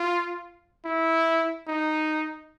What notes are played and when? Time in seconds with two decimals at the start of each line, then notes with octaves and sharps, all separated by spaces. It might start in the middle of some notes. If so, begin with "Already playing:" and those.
Already playing: F4
0.85 E4
1.68 D#4